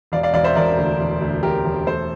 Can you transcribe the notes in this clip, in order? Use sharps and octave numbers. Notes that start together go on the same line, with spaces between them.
E1 D5 F5
D5 F5
E1 D5 F5
C5 E5
E1 A#4 D5
D2
E1
D2
E1 G4 A#4
E1
A3 A4 C5